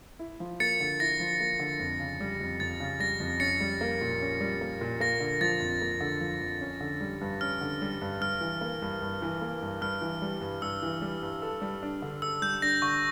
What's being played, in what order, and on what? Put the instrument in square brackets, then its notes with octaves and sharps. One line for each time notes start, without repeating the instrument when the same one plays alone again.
[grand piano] E4
F3
[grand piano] A#3 [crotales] A6 C#7
[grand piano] D3
[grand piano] E4 [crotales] A#6
[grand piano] F3
A#3
D3
F2
C#3
G3
F2
[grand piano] F2 [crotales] A6
[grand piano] C#3
[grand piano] G3 [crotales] A#6
[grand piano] F2
[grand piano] C#4 [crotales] A6 C#7
[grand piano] G3
A#3
A#2
C#4
G3
A#3
A#2
[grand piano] A#3 [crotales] A#6
[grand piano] D3
[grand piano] F3 [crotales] A6
[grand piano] F2
A#3
D3
F3
F2
C#4
D3
G3
G2
[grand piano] C#4 [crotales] F6
[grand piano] D3
G3
G2
[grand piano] G2 [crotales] F6
[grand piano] E3
A#3
G2
G2
E3
A#3
G2
[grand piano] G2 [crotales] F6
[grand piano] E3
G3
G2
[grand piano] G2 [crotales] E6
[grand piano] E3
G3
G2
A4
G3
D4
D3
[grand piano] A4 [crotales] E6
[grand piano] G3 [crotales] G6
[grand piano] D4 [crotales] A#6
[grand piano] D3 [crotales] C#6